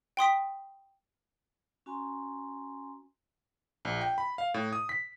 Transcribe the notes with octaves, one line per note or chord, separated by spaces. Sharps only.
G5 C6 D#6 B6
C#4 F#4 G#5 A#5 C6
A#1
G5
B5
F5
A2
D#6
B6